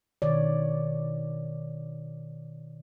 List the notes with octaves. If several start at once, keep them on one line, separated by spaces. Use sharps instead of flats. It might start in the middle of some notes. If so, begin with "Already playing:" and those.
B2 D#3 C#5 D5